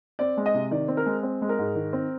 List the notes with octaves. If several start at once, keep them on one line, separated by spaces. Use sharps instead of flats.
C4 D5
G#3
D#5
C3
D#3 D5
C4
A#4
G#3
C4
G#3
A#4
G#2
D#3
C4